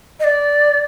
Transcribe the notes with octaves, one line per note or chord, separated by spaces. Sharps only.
D#5
D5